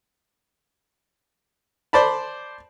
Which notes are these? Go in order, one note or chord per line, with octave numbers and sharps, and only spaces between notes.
C5 D5 A5 B5